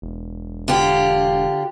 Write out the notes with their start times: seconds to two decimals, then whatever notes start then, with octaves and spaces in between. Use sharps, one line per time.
0.02 E1
0.68 D3 F4 G4